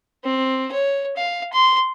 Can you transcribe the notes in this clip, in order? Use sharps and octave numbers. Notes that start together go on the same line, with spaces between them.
C4
C#5
F5
C6